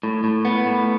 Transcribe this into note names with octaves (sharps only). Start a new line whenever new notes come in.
A2
A2
B3
A2